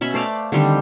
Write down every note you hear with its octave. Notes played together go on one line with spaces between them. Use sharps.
B2 C#4 E5 B5
A3 C5 D5 F5
D3 D#3 G3 C4